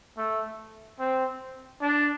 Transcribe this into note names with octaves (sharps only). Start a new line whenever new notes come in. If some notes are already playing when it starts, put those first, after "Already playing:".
A3
C4
D4